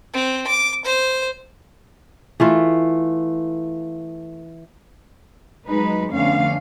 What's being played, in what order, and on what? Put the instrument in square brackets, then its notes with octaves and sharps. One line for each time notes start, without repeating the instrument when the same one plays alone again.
[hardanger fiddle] C4
D6
C5
[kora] E3 A3 F4
[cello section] F#3 G#3 D#4 B4
F2 D3 A3 B3 C#4 F5